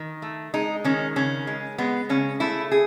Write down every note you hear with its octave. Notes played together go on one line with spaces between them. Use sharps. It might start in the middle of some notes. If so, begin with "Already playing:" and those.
Already playing: D#3
A3
G#3 D#4
D#3 C#4
C#3 C#4
G#3
G#3 B3
C#3 C#4
A3 E4
G#4